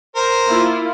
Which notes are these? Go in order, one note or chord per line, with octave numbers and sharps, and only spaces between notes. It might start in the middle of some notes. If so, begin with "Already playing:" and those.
A#4 C5
A#3 E4 F4